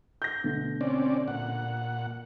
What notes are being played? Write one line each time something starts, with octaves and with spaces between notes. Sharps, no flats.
G6 A#6
D2 B2
C4 C#4 D5
A#2 F#5